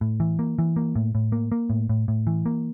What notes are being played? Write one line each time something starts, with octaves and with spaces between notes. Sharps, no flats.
A2
E3
A#3
E3
A#3
A2
A2
A#3
A#3
A2
A2
A2
E3
A#3